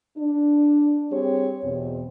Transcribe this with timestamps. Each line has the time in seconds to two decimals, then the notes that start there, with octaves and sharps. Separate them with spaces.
0.18 D4
1.12 G3 C4 G4 G#4 C#5
1.64 E2 B2 C4